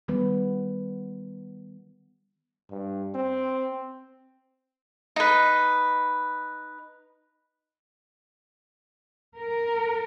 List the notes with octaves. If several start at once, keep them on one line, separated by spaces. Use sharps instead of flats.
D#3 G3 B3 B4
G2
C4
D#4 B4
A#4